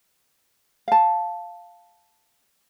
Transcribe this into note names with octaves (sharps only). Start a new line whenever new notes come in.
F5 A5